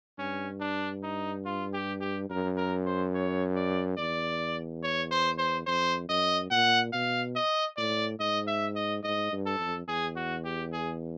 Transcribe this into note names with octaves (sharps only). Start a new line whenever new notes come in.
G2 C#4
D4
D#4
F4
G4
G4
F#2 A#4
A#4
C5
C#5
D5
E2 D5
C#5
C5
C5
F2 C5
F#2 D#5
A#2 F#5
B2 F5
D#5
A2 D5
G#2 D#5
E5
D#5
G#2 D#5
G2
A4
F2
E2 G#4
F#4
G4
G#4